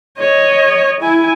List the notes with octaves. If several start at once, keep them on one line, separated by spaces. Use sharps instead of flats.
C#5 D#5
E4 G#5